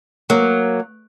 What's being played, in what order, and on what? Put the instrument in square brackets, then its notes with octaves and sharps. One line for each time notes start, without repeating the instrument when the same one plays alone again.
[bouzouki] F#3 [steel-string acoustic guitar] A#3